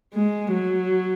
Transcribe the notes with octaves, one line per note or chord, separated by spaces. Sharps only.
G#3
F#3